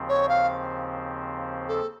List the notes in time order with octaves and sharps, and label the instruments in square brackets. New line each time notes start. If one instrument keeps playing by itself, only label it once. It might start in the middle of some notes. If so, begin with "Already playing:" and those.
Already playing: [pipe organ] D#2 C#3 F3 C4
[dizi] C#5
F5
A4